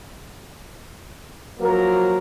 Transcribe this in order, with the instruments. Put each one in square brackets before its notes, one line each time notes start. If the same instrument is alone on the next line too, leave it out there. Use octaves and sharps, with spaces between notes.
[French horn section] F3 F#3 A#3 A#4